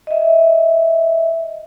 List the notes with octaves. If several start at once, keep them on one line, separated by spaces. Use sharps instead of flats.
D#5 E5